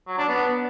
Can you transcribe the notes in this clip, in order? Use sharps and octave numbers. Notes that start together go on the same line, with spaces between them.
F#3
D4
B3